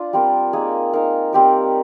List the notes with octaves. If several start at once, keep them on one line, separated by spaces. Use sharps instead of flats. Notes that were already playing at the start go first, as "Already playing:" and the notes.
Already playing: D4 F4
G3 C4 G4 A#4
A#3 D#4 G#4
D#4 A#4 F5
G3 C4 G4 A#4